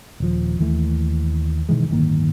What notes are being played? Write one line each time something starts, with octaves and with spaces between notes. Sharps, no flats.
D#1 F3
D#2 E3 A3
B2 D#3 E3 G#3
D1 G1 D#3 A#3